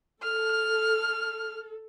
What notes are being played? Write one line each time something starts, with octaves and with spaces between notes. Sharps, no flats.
A4 F6